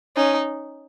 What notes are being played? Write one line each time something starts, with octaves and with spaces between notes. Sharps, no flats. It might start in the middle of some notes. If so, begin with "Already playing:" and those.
C#4 D#4